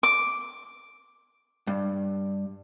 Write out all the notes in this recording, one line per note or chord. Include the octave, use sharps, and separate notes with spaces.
D6
G2